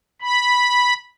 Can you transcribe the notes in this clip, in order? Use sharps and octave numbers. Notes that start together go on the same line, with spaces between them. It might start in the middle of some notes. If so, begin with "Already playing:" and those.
B5